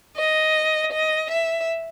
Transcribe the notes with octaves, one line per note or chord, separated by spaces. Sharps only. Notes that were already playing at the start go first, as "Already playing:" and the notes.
D#5
D#5
E5